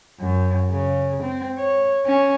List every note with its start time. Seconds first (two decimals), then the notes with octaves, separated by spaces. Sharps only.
0.20 F#2
0.70 C#3
1.23 C4
1.58 C#5
2.06 C#4